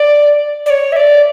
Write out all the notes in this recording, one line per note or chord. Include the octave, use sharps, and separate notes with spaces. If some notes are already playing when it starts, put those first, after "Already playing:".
Already playing: D5
D5
C#5
E5
D5